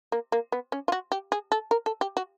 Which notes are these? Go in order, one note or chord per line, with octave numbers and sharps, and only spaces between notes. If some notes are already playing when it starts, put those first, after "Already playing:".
A#3
A#3
B3
C#4
F4
F#4
G4
G#4
A4
A#4
A4
G4
F#4